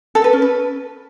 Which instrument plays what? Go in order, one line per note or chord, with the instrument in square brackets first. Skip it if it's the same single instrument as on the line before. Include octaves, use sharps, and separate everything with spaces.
[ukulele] A4
B4
C#4
B4